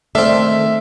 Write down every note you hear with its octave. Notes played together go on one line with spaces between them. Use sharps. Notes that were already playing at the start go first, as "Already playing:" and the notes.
D#3 A3 C4 D4 A4 E5 F6 C7